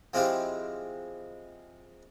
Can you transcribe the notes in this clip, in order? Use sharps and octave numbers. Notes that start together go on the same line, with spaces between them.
F3 G#3 C4 E4 F4 G4